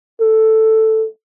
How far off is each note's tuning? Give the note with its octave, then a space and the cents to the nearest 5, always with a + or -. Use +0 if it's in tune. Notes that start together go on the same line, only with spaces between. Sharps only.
A4 +5